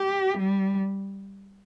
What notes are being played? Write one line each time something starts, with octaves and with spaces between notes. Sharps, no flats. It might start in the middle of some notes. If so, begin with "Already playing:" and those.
Already playing: G4
G3